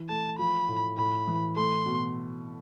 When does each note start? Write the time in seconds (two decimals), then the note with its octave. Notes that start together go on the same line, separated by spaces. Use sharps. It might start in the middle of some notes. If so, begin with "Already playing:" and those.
Already playing: E3
0.09 A3 A5
0.39 F3 B5
0.68 A2
0.97 A2 B5
1.28 E3
1.56 A3 C6
1.86 B2